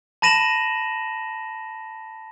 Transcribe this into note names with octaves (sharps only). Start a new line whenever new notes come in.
A5 B5 A#6 D#7 E7 F#7